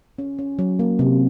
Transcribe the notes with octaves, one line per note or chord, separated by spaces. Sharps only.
C#4
C#4
F#3
A#3
C3